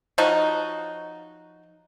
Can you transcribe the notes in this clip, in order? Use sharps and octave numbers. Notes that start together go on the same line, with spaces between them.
F3 F#3 D#4 F#4